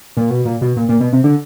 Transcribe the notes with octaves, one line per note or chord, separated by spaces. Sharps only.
A#2
B2
A#2
B2
A#2
A#2
B2
C3
D3